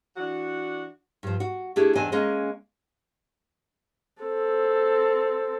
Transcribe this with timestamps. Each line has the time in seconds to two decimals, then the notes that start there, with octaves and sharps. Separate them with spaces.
0.17 E3 D4 F#4
1.23 G2 F3
1.40 F#4
1.76 A3 D4 E4 G4 G#4
1.95 E2 C4 D4 D#5 G#5
2.12 G#3 A#3 C#4 G#4 D#5
4.22 C4 A4